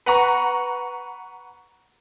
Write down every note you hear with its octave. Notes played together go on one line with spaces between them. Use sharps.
B4 F#5 A#5 C#6